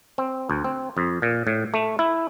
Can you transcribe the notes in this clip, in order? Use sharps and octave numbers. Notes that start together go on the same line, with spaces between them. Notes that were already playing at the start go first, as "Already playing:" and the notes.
C4
D2
C4
F2
A#2
A2
A3
E4